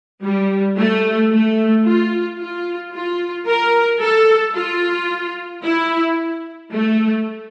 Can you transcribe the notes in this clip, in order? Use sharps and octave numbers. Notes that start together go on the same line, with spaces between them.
G3
A3
A3
F4
F4
F4
A#4
A4
F4
E4
A3